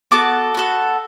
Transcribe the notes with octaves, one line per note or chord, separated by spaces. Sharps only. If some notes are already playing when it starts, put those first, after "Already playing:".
B3 F#4 A4 A5 D6
B3 F#4 A4